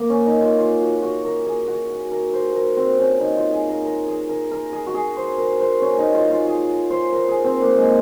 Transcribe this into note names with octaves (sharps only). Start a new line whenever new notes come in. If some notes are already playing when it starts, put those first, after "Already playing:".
Already playing: A#3
C#4
D#4
F4
F4
F#4
F#4
A#4
G#4
F#4
F#4
A#4
C5
A#4
C4
C#4
D#4
F4
G#4
A#4
A#4
G#4
A#4
A#4
G#4
F#4
G#4
C5
A#4
C5
C#4
D#4
F4
F4
G#4
C5
A#4
G#4
C4
A#3
G#3